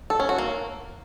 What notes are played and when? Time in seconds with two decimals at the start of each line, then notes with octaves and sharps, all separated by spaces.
0.10 A4
0.20 C#4
0.29 F#4
0.38 A#3